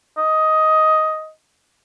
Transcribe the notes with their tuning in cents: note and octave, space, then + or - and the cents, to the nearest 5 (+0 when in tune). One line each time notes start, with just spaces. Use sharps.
D#5 +10